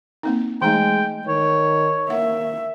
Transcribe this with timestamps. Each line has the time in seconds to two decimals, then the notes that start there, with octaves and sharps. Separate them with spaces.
0.23 A#3 C4 D#4
0.62 E3 G#3 A3 D#4 G5
1.27 D#3 C#5
2.10 A#3 E5 F#5